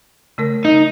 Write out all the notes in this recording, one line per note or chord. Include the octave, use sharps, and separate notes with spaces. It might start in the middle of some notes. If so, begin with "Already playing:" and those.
C#3 A3 A#4
D#4